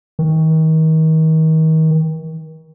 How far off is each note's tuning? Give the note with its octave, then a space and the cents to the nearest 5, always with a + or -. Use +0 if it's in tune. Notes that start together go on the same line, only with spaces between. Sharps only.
D#3 +35